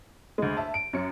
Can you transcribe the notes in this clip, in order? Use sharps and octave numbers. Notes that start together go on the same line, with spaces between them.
D2 G#3
E5 A5
D7
F#2 C#4 C#7